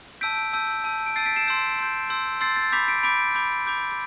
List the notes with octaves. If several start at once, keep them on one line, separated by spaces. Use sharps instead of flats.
A5 E6 G6 B6 D7
A5 E6 G6
A5 E6 G6
D7
A5 E6 G6 A6 C7
B6 D7
C7 E7
C6 E6 G6
C6 E6 G6
C6 E6 G6
C6 E6 G6 A6 C7
A6
B5 D6 G6 B6
B6 D7
B5 D6 G6 B6 D7
B5 D6 G6
B5 D6 G6